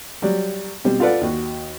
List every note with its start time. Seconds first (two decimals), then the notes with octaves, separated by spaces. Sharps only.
0.22 F#3 G3 D5
0.85 B2 G3 C4
1.00 F4 A4 B4 D5 F#5
1.21 D#2 F#4